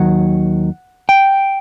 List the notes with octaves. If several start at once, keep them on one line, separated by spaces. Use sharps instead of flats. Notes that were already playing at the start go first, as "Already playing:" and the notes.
Already playing: D#2 D#3 F#3 F#5
G5